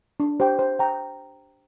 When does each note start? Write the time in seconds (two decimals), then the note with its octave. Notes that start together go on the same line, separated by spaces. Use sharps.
0.20 D4
0.40 G4 C5 G5
0.59 C5
0.79 G5 A#5